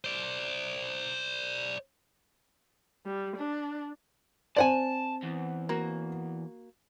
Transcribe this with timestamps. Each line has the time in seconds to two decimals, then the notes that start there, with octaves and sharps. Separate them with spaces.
0.04 C5 D5
3.06 G3
3.36 D4
4.56 C4 C5 D5 F#5 G#5 A5
5.23 E2
5.69 A#3 F#4